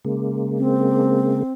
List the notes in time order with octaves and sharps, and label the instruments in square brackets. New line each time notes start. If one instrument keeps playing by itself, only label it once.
[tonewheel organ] C#3 G#3 A#3
[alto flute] C4